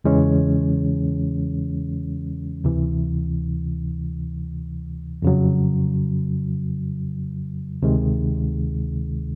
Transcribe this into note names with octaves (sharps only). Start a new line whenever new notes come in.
E2 C#3 E3 G#3 C#4
D2 C3 E3
F2 C#3 F#3
D2 C3 D#3 G#3